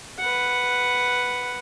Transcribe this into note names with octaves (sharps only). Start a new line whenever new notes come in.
B4 F#5